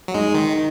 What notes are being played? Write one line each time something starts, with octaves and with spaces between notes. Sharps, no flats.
F#3
G#3 D#4
D#3